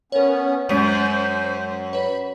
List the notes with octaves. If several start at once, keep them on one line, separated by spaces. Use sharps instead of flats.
B3 C#4 A#4 C#5
F#2 G#3 C5 B6 D#7
B4 C#5 B5